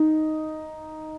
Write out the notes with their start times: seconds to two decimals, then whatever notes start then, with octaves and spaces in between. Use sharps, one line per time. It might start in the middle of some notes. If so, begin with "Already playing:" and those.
Already playing: D#4